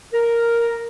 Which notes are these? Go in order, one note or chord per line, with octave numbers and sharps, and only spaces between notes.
A#4